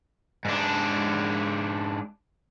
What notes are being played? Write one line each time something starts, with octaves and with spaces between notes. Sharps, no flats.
G#2 D4